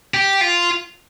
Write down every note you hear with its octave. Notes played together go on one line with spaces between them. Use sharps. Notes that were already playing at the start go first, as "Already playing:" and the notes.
G4
F4